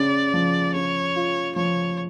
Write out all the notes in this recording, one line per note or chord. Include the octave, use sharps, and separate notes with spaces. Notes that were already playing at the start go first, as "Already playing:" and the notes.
Already playing: C#3 D5
F3
C#3 C#5
F4
F3 C#5